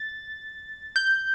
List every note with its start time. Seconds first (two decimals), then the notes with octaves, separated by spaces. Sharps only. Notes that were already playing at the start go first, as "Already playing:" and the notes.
Already playing: A6
0.96 G6